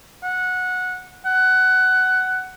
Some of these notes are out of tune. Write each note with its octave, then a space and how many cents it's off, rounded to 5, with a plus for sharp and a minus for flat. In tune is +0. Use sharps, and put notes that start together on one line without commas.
F#5 -15
F#5 +15